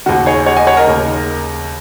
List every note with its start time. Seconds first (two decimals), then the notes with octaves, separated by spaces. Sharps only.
0.06 D#2 C#3 F#4
0.26 G#4 C#5
0.46 C#5 F#5
0.56 D#5 G#5
0.67 C#5 F#5
0.77 A#4 D#5
0.87 D#2 C#3